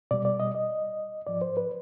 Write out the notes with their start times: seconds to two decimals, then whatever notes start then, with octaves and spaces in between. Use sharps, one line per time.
0.11 B2 G3 D5
0.25 D5
0.40 D#5
0.55 D#5
1.27 G#2 F3 D5
1.41 C5
1.57 B4